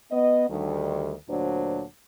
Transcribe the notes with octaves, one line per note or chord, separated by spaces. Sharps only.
B3 D#5
D2 D#3 G3
D2 A#2 F#3 D4 C5